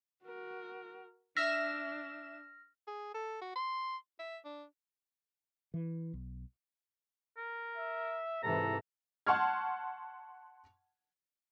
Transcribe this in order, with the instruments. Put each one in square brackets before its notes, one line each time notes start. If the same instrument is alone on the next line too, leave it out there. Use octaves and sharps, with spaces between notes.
[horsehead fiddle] F#4 A#4
[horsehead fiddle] D4 [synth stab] E5 E7 [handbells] F6 A#6
[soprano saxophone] G#4
A4
F#4
C6
E5
D4
[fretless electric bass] E3
B1
[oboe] A#4
[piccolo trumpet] E5
[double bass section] G#2 C3 E3 [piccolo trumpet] A4 [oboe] A#5
[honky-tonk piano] F#5 A5 C6 C#6 F6 G#6